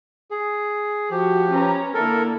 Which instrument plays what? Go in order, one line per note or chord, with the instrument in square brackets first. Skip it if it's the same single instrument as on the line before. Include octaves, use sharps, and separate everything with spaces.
[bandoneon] G#4
[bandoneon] F3 G4 [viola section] F#4
[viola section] C#4 B4 A#5
[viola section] D3 A#3 E4 [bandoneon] A4 A#4